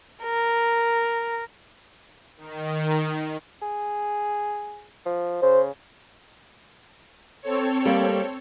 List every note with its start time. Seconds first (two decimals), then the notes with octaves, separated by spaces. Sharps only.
0.22 A#4
2.37 D#3
3.62 G#4
5.06 F3
5.43 C#3 C5
7.42 C4 A4 C#5
7.85 G3 A#3